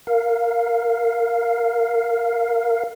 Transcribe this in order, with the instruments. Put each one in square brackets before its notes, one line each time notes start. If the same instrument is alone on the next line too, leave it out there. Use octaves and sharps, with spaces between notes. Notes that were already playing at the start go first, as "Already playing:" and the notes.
[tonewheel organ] A#4 F5